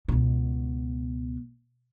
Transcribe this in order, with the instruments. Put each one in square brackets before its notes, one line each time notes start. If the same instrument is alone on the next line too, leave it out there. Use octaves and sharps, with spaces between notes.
[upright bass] C#2 B2